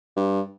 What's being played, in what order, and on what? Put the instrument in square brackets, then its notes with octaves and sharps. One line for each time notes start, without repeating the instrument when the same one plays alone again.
[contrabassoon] G2